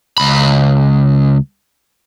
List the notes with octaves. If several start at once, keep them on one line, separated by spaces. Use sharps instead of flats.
C#2 B5